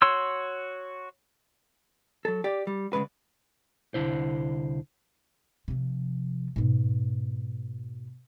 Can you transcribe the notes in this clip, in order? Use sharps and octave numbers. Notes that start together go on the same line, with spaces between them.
F#4 C#5 C6 E6
F#3 A4
G4 D5
G3
D2 A2 C#3 G#3 B4
C2 D3 E4 C5
C3 F3
G#2 B2